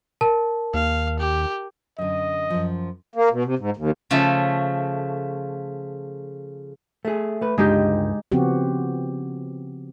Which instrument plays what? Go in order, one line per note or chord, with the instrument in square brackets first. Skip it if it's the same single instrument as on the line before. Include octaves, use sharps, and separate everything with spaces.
[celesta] A#4 A5
[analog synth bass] D#2 [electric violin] F5
[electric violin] G4
[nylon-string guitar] F#2 D3 [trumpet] D#5
[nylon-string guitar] F#2 F3
[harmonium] A#3
B2
C3
G#2
D#2
[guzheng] C#3 F3 A3
[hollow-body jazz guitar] A3 G#4
A3 B4
[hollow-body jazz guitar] C#2 G2 D3 [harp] G#3 D#4 G4
[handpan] C#3 F3 B3 C4 F#4 G4